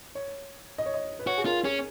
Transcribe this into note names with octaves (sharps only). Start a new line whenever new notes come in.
C#5
D#5
C#5
D#5
B4
F#4 C#5
G#4
F4 A#4
C#4 G#4